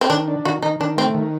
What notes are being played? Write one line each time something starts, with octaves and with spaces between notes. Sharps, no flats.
C4
D#3 D4
D4
D#3 F#4
D#3 D#4
D#3 D4
A3 C4
D#3